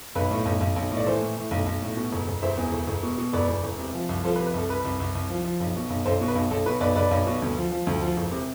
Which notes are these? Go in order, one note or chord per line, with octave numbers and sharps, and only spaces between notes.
B1 B4
A2
B1
B1
B1
A2
D5
E3 A4 C5
A2
A2
B1
B1
A2
B2
E1
E1
E1 C5 E5
E2
E1
E1
B2
B2
E1 B4 D5
E1
E1
C3
F3
C2
F3 A4 C5
B4
C3
B4
C2 A4
C2 B4
C2
C2
C2
F3
F3
B1
B2
B1
B1 A4 C5
B2
B4
B1
B1 A4
B2 B4
B1 B4 D5
B1 B4 D5
B1
B2
D2
F3
F3
D2
F3
E1
C3